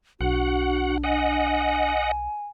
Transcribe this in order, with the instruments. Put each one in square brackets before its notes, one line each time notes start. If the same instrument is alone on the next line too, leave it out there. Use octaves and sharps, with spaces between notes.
[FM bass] B1 [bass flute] D4 [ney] F#4 [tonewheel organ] F#5
[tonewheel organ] D#5 F#5 [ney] G#5